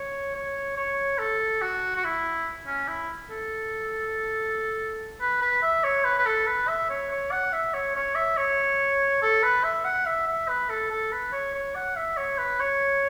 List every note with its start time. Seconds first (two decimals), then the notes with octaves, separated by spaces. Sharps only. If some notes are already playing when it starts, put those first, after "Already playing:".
Already playing: C#5
0.35 C#5
0.77 C#5
1.19 A4
1.62 F#4
1.96 F#4
2.04 E4
2.67 C#4
2.88 E4
3.30 A4
5.21 B4
5.42 B4
5.63 E5
5.84 C#5
6.05 B4
6.18 B4
6.26 A4
6.47 B4
6.68 E5
6.90 C#5
7.11 C#5
7.32 F#5
7.53 E5
7.74 C#5
7.95 C#5
8.16 E5
8.37 C#5
9.22 A4
9.43 B4
9.64 E5
9.85 F#5
10.06 E5
10.27 E5
10.49 B4
10.70 A4
10.91 A4
11.12 B4
11.33 C#5
11.54 C#5
11.75 F#5
11.96 E5
12.17 C#5
12.39 B4
12.60 C#5